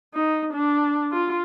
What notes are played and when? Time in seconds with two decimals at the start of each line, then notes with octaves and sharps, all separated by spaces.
0.14 D#4
0.54 D4
1.12 F4